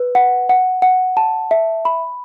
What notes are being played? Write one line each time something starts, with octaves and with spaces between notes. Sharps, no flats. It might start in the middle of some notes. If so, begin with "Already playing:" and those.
Already playing: B4
F#5
F#5
F#5
A5
E5
B5